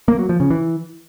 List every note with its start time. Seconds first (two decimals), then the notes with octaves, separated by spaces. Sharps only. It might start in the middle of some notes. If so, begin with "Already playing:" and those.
0.08 A#3
0.19 F#3
0.29 F3
0.40 C#3
0.50 E3